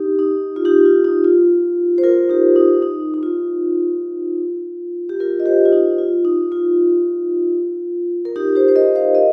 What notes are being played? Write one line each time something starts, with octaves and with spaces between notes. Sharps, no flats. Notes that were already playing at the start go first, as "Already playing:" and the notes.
Already playing: D#4 G4
D#4
F4
D#4 G4
F4
D#4
F4
C5
F4 A#4
D#4 G4
D#4
D#4
D#4
F4
G4
F4 A#4
D#5
G4 C5
F4
D#4 G4
F4
D#4
F4
A#4
D#4 G4
G4 C5
C5
A#4 D#5
C5 F5
A#4 D#5